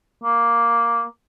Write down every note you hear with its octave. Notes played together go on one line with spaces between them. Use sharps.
A#3